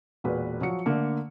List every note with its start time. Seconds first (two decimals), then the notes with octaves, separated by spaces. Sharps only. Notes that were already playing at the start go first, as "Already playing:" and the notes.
0.24 E1 A#2 F#4 B4
0.61 F3 F#3 F#4 C#7
0.86 D3 A3 A#3